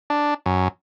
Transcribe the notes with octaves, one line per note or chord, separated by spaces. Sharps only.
D4
F#2